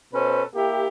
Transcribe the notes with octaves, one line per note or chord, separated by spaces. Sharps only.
B2 C#4 A4 B4 C5
A#3 E4 G4